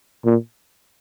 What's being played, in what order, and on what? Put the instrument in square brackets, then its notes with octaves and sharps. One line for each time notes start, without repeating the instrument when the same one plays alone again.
[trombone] A#2